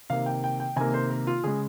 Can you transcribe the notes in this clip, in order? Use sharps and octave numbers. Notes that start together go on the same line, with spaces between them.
C3 D#3 A#3 F5
G5
G5
G5
C3 D#3 A#3 G#5
C5
A#4
F4
C#3 G#3 G#4